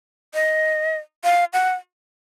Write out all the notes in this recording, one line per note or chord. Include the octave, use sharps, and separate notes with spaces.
D#5
F5
F#5